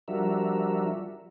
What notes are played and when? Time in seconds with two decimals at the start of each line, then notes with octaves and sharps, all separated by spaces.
0.08 F3 G3 D4 F#4 A#4 E5